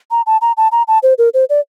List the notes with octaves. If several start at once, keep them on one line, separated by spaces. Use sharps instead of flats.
A#5
A5
A#5
A5
A#5
A5
C5
A#4
C5
D5